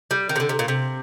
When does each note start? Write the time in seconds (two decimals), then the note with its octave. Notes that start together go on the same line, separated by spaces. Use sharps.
0.11 G3
0.29 D#3
0.36 C3
0.40 D3
0.49 C3
0.59 A#2
0.68 C3